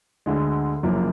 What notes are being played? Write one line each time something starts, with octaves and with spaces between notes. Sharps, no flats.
D2 D3 G#3
F#1 F#2 F3 A#3